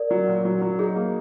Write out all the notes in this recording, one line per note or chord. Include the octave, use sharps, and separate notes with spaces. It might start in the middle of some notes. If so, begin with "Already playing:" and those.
Already playing: A#4 D5
F#3
A#2
F#3
F#3
D#4 G#4
A#3